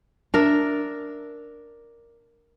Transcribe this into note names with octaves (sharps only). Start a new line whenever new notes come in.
D4 A#4 E5